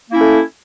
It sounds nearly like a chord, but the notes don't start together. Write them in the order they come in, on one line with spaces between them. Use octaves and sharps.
A#3 E4 C#4 A3